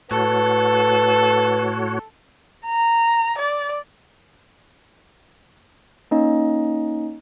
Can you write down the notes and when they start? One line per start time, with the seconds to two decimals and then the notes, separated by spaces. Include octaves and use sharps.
0.11 A2 F#4 A4 B4 C#5
2.65 A#5
3.38 D5
6.11 A#3 C#4 D#4 D#5